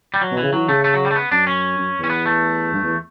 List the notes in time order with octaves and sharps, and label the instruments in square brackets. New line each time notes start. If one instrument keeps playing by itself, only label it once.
[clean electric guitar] G3
F#3
[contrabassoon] B2
[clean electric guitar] E3
[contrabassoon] C#3
[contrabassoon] E3 [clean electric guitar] F#3
[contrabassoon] C#3 [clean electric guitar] A3
[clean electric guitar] A3
F#3
G3
A3
B3
[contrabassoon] F#2 [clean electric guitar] D4
[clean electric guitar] C#4
[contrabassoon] F#2
[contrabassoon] E2 [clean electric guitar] C#4
[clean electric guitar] B3
A3
[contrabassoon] G2
E2